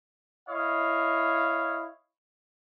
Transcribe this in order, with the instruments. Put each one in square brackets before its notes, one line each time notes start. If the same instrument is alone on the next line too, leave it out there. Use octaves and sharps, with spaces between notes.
[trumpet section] E4 C#5 D#5 F5